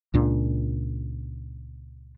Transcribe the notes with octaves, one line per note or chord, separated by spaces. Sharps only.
C#2 A#2 D4